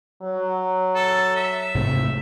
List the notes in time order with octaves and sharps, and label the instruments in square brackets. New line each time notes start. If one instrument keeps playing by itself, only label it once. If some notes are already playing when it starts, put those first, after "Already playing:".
[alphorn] F#3
[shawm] A4
E5
[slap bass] G#2 C3 A3